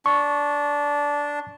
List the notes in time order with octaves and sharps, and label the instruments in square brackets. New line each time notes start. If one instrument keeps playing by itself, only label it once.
[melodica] D4 [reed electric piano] C#6